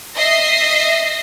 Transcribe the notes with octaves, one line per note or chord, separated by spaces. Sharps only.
D#5 E5 A#6 C7